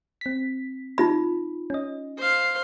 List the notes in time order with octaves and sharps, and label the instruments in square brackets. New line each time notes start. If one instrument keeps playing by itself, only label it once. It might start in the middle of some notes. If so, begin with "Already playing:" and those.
[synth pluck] C4 B6
[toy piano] D#4 F4 B5
[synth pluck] C#4 D#5
[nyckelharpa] C5 F5